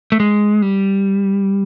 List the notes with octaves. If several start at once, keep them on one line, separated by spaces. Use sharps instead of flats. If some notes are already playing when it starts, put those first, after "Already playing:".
A3
G#3
G3